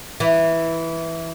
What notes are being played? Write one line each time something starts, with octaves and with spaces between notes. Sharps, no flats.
E3